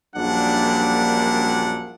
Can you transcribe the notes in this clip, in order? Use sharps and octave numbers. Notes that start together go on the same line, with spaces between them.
A#1 F#2 A#2 G3 D4 F#5